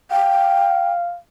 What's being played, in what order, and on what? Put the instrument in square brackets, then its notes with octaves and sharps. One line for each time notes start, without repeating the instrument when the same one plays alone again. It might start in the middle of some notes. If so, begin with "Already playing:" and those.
[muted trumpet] F5 [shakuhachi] G5